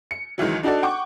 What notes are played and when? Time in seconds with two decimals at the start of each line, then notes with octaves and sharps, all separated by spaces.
0.11 C#7
0.38 C#2 D#3 E3 F#3
0.63 D4 D#4 F#4 A4 D5
0.82 F#5 G5 C#6 D6